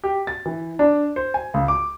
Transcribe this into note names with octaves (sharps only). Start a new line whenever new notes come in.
G4
A6
E3
D4
C5
G#5
C#2
D6